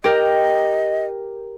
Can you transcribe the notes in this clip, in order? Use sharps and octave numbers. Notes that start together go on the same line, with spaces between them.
G4 A#4 D#5